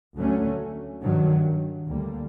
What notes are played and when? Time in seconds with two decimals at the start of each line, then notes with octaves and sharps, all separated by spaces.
0.15 D2 D3 F#3 A3 C#4
1.01 G2 D#3 F#3
1.87 D2 D3 G3 A#3